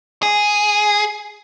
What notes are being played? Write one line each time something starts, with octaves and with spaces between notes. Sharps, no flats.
G#4